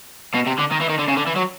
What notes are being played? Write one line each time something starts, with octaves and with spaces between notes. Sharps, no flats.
B2
C3
D3
D#3
E3
D#3
D3
C#3
D3
E3
F#3